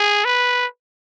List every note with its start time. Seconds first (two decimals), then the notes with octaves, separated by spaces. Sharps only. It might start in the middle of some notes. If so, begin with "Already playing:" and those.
Already playing: G#4
0.25 B4